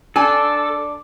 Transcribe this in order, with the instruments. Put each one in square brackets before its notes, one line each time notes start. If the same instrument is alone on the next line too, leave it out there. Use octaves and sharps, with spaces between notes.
[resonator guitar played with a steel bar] D4 G#5 [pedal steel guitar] A4